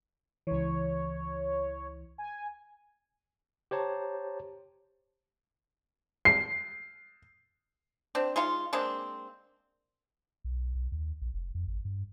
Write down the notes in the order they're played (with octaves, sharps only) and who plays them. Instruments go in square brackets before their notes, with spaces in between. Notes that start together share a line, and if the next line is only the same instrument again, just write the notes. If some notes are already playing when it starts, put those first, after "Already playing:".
[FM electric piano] C#2 E3 [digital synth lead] C#5
[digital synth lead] G#5
[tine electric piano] G4 C5 C#5 A5 A#5
[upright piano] C7
[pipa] C4 D4
G#3 D#4 F4
G#3 A#3 C4 D4
[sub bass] B1
B1
D#2
A#1
F1
F2
G#1
G2